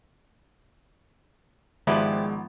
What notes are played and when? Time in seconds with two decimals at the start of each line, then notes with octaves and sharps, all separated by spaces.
1.87 G#1 F3 G#3 B3 E4 G4 C5